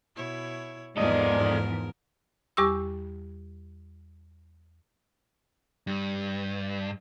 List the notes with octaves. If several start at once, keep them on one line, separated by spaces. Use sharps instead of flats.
B2 E4 C#5
E2 G#2 F3 G#3 A4 A#4 D5 D#5
E2 G3 G4 C#6 D6 E6
G2